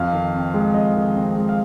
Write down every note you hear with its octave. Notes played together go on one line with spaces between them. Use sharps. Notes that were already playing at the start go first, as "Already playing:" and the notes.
Already playing: F2 F5
D#3
C4
G#3
F2 D#5
D#3
C4
G#3
F5